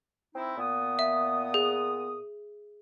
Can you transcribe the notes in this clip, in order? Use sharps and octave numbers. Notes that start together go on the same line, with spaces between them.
C4 D#4 E4
A#2 B3 D#6
E5
G#4